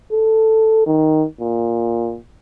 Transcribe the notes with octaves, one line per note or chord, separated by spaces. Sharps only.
A4
D#3
A#2